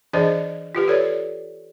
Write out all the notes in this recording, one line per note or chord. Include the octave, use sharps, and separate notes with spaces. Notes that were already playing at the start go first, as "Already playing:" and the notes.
E3 D4 G#4 C5 D5 D#5
F4 G4 B4
A4 C#5 D5